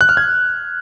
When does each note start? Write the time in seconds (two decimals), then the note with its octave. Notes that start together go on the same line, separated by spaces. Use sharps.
0.01 F#6
0.09 F6
0.17 G#6